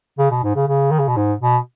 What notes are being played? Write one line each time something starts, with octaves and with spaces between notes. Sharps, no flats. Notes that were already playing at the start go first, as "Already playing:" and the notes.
C#3
B2
G#2
C#3
C#3
D#3
C#3
B2
G#2
B2